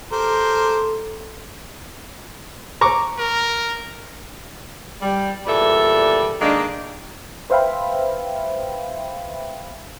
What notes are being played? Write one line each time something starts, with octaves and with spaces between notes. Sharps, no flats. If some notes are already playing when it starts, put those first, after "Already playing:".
G4 A4 A#4 C5
A#5 C#6 D6
A#4
G3
E2 A#2 G3 A4 E5
D#3 G#3 A#3 D4
B4 C5 E5 F5 G5 B5